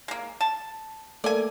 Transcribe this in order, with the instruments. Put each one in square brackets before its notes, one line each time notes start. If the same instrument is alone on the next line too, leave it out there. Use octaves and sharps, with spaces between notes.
[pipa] G#3 A#3
A5
[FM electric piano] A3 A#3 A4 [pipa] D5 G#5